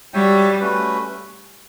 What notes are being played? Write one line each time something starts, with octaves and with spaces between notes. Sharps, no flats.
G3 F#4 C#5 E5 G5
A3 C#4 F#4 B4